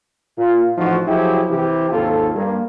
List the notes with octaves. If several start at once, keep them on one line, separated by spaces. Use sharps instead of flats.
A#2 F4
A1 F3 D#4 F#4
F3 F#3 E4 G4 G#4
C3 E3 G4
G#1 D#2 F4 A4
G2 A#3